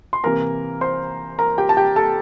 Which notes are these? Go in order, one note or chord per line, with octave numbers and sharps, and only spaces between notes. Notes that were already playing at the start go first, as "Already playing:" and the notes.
C6
C3 E3 A#3 A#4 A#5
C5 C6
A#4 A#5
G4 G5
A5
G4 G5
A4 A5